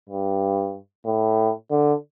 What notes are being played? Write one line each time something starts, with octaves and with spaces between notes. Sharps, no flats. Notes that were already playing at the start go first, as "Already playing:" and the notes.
G2
A2
D3